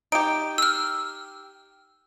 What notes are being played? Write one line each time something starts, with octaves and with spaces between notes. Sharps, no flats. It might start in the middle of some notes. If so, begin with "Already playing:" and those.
D#4 G4 D7
E6 F6